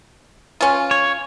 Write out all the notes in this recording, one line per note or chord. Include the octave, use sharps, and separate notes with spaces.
C#4 F4
C#5